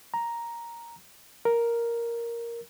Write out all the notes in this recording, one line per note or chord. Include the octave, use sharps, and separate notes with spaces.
A#5
A#4